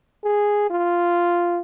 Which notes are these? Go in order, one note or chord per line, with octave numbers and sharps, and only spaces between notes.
G#4
F4